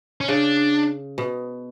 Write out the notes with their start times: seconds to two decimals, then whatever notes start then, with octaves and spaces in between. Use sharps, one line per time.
0.21 C#4
0.28 C#3 D4
1.18 B2